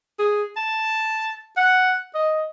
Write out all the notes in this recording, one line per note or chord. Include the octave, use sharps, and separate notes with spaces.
G#4
A5
F#5
D#5